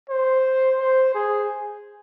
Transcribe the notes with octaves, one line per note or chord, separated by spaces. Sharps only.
C5
C5
G#4